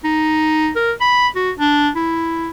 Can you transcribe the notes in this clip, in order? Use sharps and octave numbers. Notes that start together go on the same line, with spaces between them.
D#4
A#4
B5
F#4
D4
E4